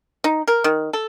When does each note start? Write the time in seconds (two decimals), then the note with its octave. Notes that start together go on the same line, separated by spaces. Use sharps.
0.24 D#4
0.48 A#4
0.64 D#3
0.93 A4